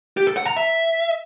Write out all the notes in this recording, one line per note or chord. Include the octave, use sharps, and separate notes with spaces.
G4
A4
F#5
A#5
E5